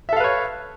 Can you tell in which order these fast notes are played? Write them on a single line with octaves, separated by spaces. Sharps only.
E5 A4 F5 B4 C#5